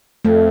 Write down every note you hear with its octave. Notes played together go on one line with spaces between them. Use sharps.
F2 A3